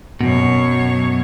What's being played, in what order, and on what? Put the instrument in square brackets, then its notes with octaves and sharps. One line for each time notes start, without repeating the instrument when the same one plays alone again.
[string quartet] F#2 C#5 [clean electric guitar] B2